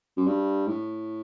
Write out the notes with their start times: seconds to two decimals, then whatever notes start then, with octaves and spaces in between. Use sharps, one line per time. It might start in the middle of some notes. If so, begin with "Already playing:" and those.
0.17 F#2
0.27 G2
0.67 A2